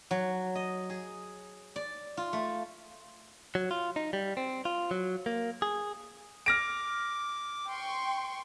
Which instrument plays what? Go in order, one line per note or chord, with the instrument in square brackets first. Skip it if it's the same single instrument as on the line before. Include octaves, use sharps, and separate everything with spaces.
[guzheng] F#3
D#5
G#4
D5
F4
A3
[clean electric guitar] F#3
F4
D#4
G3
C4
F4
F#3
A#3
G#4
[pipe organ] D6 [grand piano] F6 A#6 D7
[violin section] G5 C6 C#6